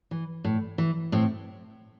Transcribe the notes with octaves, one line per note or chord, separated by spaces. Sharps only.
E3
A2
E3
A2 C4